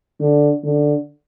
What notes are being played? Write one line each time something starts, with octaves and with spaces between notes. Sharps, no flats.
D3
D3